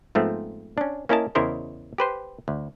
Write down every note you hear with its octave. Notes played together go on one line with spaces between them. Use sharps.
G#2 F3 A3 B3 C4
C#4 D4
A#3 C#4 E4 A#4 D#5 A5
E2 C#3 E4 A#4 C5 D#5
G4 B4 C5
D2